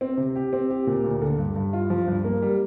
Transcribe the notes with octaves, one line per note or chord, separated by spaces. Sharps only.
C4
C3
G4
C4
G4
A#2
D2
D3
G2
G2
F4
F3
G2
A#3
G3